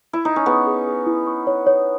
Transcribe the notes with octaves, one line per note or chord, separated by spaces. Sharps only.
E4
D#4
C#4
B3 G#4
G#4
G#4
E4
C#6
C#5
C#5